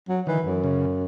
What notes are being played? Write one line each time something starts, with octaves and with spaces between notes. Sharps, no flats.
F#3
D#3 E3
F#2
C#3